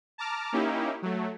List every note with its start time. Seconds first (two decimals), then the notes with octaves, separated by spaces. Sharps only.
0.18 A5 A#5 D6 F6
0.53 A#3 C#4 D#4 E4 G4
1.02 F#3 A3